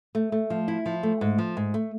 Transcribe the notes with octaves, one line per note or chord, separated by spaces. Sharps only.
A3
A3
F3
E4
F3
A3
G#2
F3
G#2
A3